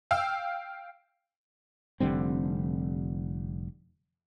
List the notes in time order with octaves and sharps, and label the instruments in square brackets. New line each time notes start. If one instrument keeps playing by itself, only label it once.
[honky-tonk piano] F5 G5 E6
[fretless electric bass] F1 D3 G3 C4